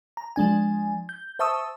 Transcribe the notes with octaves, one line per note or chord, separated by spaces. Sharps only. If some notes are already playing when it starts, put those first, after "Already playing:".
A#5
F3 G#3 D4 G#5
G6
C5 E5 A5 C#6 D#6 E6